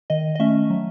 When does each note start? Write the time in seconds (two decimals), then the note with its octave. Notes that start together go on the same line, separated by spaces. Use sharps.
0.10 D#3 D#5
0.35 D#5
0.40 A3 C#4 E5
0.70 F#3